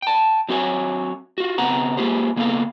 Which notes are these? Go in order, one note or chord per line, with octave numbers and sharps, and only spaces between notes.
G5 A5
F#3 C4 F#4 C#5 G#5
F4 F#4
C#3 B3 C4 F#5 A#5
G#3 A#3 F4 G4 C5
C#3 A#3 B3 A4 F5